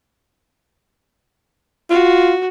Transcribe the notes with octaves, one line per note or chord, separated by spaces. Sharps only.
F4 F#4